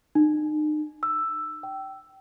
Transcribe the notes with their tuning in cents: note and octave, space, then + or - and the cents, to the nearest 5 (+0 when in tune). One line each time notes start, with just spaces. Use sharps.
D#4 -40
E6 +5
G5 -20